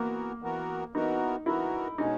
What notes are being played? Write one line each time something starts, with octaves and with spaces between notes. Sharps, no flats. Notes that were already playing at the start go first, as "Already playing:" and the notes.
Already playing: E3 A#3 B3 F#4 A#4
E3 B3 F#4 A#4
E3 B3 D#4 F#4 A#4
E3 B3 E4 F#4 A#4
B2 G#3 C#4 D#4